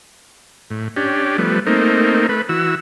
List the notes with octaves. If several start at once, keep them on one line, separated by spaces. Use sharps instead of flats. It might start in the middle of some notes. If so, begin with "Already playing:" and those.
A2
C#4 D4 G4
F3 G3 A3 B3
A3 A#3 C4 D#4
A3 B4
E3 F#4 E6